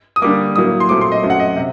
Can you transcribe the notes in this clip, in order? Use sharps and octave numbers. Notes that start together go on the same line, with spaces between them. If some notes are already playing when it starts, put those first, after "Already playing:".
D#6
D3 G3 A#3 D6
A2 F#3 A#3 D#6
C6
A#2 F#3 A3 C4 D6
C6
D#5
F#2 F#3 A3 C4
F#5
D#5
C3